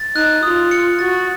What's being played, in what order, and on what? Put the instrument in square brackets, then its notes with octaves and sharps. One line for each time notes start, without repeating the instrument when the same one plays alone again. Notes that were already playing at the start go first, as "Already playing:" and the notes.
Already playing: [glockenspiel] A6
[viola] D#4 [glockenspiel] F#6
[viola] F4 [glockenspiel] D#6
[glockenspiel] C#7
[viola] F#4 [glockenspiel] A6